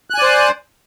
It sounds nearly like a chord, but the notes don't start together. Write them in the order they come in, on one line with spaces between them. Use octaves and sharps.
F#6 G#5 D5 C5